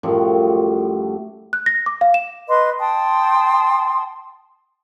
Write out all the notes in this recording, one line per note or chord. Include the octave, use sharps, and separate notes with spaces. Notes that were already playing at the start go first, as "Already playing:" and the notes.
F#2 A2 F3 G3
F#6
A#6
D6
F5
E7
B4 D#5 C6 D6
G5 A5 C6 D#6